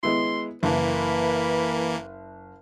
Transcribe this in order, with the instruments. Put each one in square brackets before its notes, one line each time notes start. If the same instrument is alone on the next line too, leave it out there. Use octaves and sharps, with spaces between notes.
[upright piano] G#3 B3 E4 [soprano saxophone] C6
[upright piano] F#1 [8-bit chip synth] E3 A#3 [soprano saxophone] B4